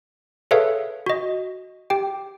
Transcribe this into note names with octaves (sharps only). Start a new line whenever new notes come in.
G#4 A4 B4 C#5 E5 F5
F#4 D#5
G4 G5